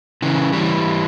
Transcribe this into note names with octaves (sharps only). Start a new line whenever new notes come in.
C#3 E3
E3 G3